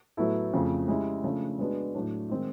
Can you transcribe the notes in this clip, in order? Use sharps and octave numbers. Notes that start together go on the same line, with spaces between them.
A2 F#3 B3 E4 A4
F2 C#3 F3 A3 C4
G#3 C#4 E4 G4
C#3 F3 A3 D4
G#3 B3 D4 F#4
A2 F#3 A3 D4
D#3 G#3 C4 D#4